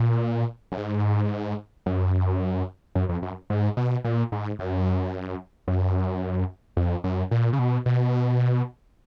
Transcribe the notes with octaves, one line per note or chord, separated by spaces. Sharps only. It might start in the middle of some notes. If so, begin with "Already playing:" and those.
Already playing: A#2
F#2
G#2
F#2
F#2
F2
F#2
G#2
B2
A#2
G#2
F#2
F#2
F2
F#2
A#2
C#3
B2
B2